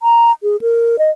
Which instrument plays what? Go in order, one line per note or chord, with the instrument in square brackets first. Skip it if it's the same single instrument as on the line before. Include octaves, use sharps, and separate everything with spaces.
[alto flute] A#5
G#4
A#4
D#5